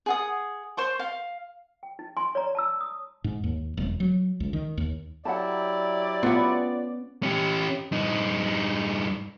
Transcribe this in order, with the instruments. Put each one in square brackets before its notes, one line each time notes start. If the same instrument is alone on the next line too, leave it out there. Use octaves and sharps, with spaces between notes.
[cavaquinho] G#4 F#5 D#6
C5 C6 C#6
F5
[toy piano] G5
D#4
G#5 C6
C#5 D5 A#5
A5 A#5 E6
D#6
[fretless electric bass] G#2
D#2
E1
F#3
C#2
D#3
D#2
[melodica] F#3 E4 G4 [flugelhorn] D5 [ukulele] F#5 A5
[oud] B3 C#4 [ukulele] F4 F#5
[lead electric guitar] C#4 G4
G2 D#4